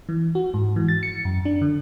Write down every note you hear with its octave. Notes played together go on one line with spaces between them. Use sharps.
E3
F#4
G#2
E3
A6
C#7
F#2
D4
D3